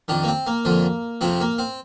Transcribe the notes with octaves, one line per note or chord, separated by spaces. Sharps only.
F2 D#3 D4
A#3
C4
A#3
F2 D3 F3
F2 C3 F3 C4
A#3
C4